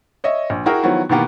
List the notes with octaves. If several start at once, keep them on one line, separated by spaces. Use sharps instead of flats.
C#5 D#5 E5
A#1
E4 F#4 G#4 A#4 G5
D#3 F3 F#3 B3 E4
B2 D#3 E3 A#3 B3 G4